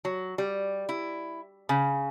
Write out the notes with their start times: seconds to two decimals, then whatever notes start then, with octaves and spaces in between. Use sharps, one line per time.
0.05 F#3
0.38 G3
0.89 E4
1.69 C#3